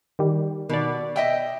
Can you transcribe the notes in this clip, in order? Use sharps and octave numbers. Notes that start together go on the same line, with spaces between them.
D#3 G3
B2 D#3 D5
D#5 E5 G5